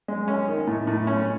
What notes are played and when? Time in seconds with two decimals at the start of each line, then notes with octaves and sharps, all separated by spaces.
0.08 G#3
0.28 C#4
0.48 D#3
0.67 A2
0.87 A2
1.07 C#4